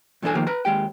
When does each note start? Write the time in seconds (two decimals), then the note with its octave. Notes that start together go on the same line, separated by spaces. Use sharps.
0.22 G2 E3 C4 D4 A4 G#5
0.35 D#3 F3 A#3 D#4 G4
0.47 B4 A#5
0.65 D#2 G#3 G4 G5